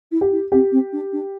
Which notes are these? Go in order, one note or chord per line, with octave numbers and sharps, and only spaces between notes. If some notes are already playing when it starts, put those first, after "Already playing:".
E4
G4
E4
C4 G4
C4
D4
D4